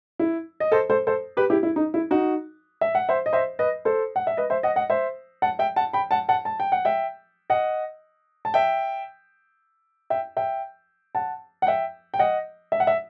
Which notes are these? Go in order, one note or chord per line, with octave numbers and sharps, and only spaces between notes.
E4
D#5
A4 C5
A4 C5
A4 C5
G4 B4
E4 G4
E4
D#4
E4
D#4 F#4
E5
F#5
C5 E5
D#5
C5 E5
B4 D#5
A4 C5
F#5
E5
B4 D#5
C5 E5
D#5 F#5
D#5 F#5
C5 E5
F#5 A5
E5 G5
F#5 A5
G5 B5
F#5 A5
F#5 A5
A5
G5
F#5
E5 G5
D#5 F#5
A5
E5 G5
E5 G5
E5 G5
F#5 A5
F#5
E5 G5
G5
D#5 F#5
E5
F#5
E5